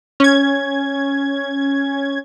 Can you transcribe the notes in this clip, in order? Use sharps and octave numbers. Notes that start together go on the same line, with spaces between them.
C#4 G#6